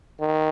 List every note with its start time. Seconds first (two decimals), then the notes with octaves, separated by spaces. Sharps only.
0.21 D#3